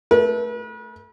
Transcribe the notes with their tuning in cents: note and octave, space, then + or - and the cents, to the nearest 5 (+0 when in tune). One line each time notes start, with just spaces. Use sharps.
A3 -10 B4 -40